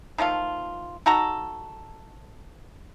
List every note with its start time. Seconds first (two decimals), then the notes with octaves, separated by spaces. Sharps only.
0.18 D#3 F3 A3 F4
1.06 D#4 F#4 A4 A#5